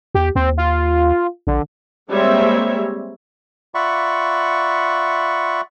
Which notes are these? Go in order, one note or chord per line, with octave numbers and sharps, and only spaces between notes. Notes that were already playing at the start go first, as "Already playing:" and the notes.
E2 G4
D#2 C4
F4
A#1 D3
G3 G#3 A#3 C4 C#5 E5
F4 D5 E5 F#5 B5 C#6